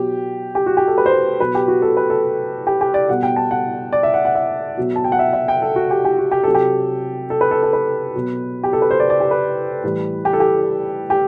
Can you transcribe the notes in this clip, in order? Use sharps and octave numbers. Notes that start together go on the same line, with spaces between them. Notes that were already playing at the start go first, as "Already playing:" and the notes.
Already playing: B2 F#3 G4
G4
F#4
G4
A4
B4
C5
B4
B2 F#3 B4
G4
F#4
A4
B4
A4
G4
G4
D5
B2 G3 F#5
G5
A5
F#5
D5
E5
F#5
F#5
E5
B2 F#3
A5
G5
F#5
E5
E5
G5
A4
F#4
G4
G4
F#4
G4
C3 F#3 A4
G4
A4
B4
A4
A4
B4
B2 F#3
G4
A4
B4
C5
D5
D5
G4
B4
A2 E3 G3
G4
A4
G4
G4